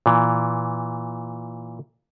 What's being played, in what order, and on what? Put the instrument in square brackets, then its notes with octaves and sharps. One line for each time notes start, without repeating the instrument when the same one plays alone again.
[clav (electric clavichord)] A#2 E3